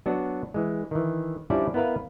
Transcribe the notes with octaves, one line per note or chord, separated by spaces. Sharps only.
F#3 B3 D4 F#4
E3 G#3
D#3 E3
F3 G3 C#4 D4 E4 D5
B3 E4 A#4 B4 F5